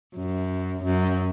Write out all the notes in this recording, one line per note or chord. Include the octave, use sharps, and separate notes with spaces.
F#2
F#2